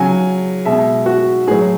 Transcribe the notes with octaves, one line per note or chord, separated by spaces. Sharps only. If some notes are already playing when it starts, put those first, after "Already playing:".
Already playing: C#3 F#3 G#5
B2 G#3 E5
F#4
A2 F#3 G#4